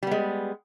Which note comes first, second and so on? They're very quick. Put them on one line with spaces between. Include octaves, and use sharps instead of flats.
G3 B3 G#3